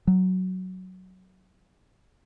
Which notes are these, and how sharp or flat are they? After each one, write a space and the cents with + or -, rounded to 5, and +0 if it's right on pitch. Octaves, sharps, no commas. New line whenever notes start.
F#3 +5